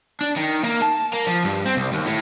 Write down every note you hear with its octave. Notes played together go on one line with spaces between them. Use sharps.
D4
D#3
A#3
A5
A#3
F3
G2
C4
C2
D#2
A2